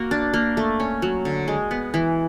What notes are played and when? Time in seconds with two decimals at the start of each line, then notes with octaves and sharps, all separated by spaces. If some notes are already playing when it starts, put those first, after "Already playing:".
Already playing: A#3 F#4
0.11 D4
0.34 A#3
0.57 A3
0.80 C#4
1.02 F#3
1.25 D3
1.48 G#3
1.71 B3
1.94 E3